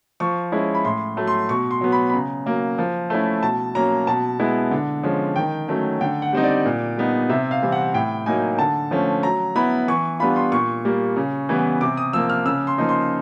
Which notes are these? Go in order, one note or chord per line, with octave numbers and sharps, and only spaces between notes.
F3 C#6
G#3 C#4 E4
B5
A2 C6
F#3 A3
C6
B2 C#6
C6
F#3 B3
B5
B5
C#3 A#5
F#3 A#3
F3
A3 C#4 E4
B2 A5
F#3 A#3 C#4 A#5
B2 A5
G#3 B3 E4
D3
F3 G#3 C#4
D#3 G5
F#3 A3 C#4
D3 G5
F#5
G3 C4 D#4
D5
A#2
G3 B3 D#4
C3 E5
F5
E3 G3 C4
F#5
A2 G5
F#3 A#3 D#4 G#5
D3 A5
F3 A3 C#4
F#3 A#5
B3 E4 B5
E3 C#6
G3 B3 D4 F4 B5
C6
A#2 C#6
G3 A#3
C#3
E3 G3 B3
C3 D6
D#6
F3 A#3 E6
F6
C#3 E6
C6
F3 A#3 D#4
C6